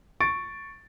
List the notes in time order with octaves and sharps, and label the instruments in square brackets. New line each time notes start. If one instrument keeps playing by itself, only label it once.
[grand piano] C#6 A6 D7